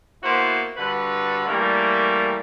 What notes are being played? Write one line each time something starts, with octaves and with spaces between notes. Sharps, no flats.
A#3 B3 E4 F#4 C5
G2 D3 F#4 B4
E3 G3 A3 A#3